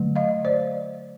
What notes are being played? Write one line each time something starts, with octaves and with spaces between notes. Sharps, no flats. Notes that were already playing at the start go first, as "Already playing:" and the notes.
Already playing: D3 F#3 A3
D#5 F5
C5 D5